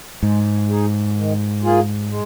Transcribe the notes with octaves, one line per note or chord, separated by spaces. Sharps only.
G#2 G#3
D#4 G#4
D#3
A#3 F4 G#4
G#3